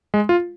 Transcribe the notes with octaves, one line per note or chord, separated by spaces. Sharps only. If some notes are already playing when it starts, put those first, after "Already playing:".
G#3
F4